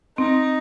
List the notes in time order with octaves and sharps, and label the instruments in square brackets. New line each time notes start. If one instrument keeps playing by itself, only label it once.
[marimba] C4 [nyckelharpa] D#4